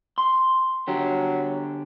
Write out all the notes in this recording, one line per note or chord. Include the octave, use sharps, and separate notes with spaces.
C6
D3 F#3 G4